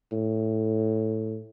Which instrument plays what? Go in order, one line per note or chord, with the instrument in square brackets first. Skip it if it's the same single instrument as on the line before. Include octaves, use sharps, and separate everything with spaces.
[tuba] A2